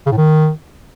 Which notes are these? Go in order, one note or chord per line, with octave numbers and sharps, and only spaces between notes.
C#3
A2
D#3